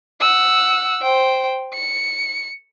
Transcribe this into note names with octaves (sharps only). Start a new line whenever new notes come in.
F#5 E6
C5 G5
C#7